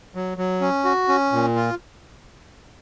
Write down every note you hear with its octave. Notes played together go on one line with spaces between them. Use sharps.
F#3
F#3
C#4
F#4
C#4
A#2
F4